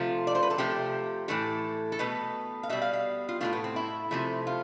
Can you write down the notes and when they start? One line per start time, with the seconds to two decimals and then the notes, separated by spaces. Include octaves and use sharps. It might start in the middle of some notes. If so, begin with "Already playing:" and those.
Already playing: C3 F3 A3 F4
0.27 D5
0.35 C5
0.43 B4
0.50 A4
0.58 C3 F3 A3 G4
1.28 A2 E3 A3 A4
1.92 A4
1.99 B2 A3 B4
2.63 F5
2.69 B2 G3 E5
2.82 F5
2.93 F5
3.29 F4
3.41 A2 F3 A3 F4
3.53 B3
3.64 C4
3.76 E4
4.11 C3 F3 A3
4.47 F4